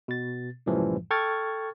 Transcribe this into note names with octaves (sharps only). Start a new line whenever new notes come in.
B2 A6
C2 F#2 A2 E3 F3 G3
A4 G5 C#6 F6 G#6 A6